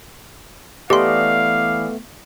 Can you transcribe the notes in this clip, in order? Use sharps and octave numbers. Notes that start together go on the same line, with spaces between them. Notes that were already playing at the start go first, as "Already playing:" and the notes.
E3 A3 B3 G4 D5 D#5 F5 C6